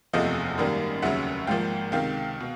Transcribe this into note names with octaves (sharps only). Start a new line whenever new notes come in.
F#1 E2 C3 F3 A3 D#5 F5
G#1 F#2 D#3 G3 A#3
F1 D#2 C#3 F#3 E5 F#5
G#1 G#2 F3 A#3 F5 G5
C#2 C3 D#3 F5 G5
B2